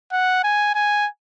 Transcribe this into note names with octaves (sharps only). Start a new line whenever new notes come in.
F#5
G#5
G#5